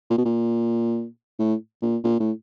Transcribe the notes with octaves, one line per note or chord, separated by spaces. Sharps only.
A#2
B2
A#2
A2
A#2
A#2
A2